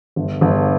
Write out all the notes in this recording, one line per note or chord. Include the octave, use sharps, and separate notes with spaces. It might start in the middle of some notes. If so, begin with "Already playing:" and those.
G1
G1